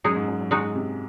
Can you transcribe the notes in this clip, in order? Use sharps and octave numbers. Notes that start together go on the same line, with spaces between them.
F#2 G#3 D#4 G#4
G#2
F#2
F#2
G#2 G#3 D#4 F#4
C3